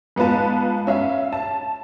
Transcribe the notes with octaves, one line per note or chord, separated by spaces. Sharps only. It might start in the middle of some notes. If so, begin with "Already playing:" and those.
G#2 B3 F4 B4 A5
C#4 E5 F5
A5